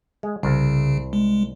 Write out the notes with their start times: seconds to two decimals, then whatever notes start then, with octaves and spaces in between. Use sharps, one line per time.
0.23 G#3
0.43 C2 C#3
1.13 G#3